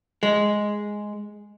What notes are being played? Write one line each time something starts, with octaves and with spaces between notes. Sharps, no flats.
G#3